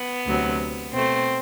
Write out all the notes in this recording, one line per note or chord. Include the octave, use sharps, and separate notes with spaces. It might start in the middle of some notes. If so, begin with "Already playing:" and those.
Already playing: B3
D2 C3 F#3
B2 A3 C4